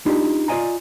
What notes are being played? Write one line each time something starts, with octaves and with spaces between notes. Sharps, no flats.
D4 D#4 F4 G4
F4 D5 D#5 G#5 A#5